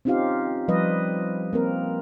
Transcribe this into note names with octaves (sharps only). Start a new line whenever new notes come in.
C4 C#4 D#4 F4 G4 F5
F3 G3 B4 D#5
A#3 C4 A#4